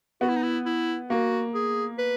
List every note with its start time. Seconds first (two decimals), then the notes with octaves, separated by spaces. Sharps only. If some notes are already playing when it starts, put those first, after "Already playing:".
0.21 B3 F#4
0.28 E4
0.36 D#4
0.43 E4
0.65 E4
1.10 A#3 F#4
1.54 G#4
1.98 B4